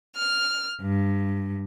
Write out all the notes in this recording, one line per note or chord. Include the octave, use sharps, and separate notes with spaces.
F6
G2